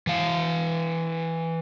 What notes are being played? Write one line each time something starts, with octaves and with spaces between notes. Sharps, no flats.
E3 F5